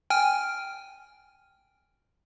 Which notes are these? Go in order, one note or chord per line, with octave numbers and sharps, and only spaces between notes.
G5 G#5 F6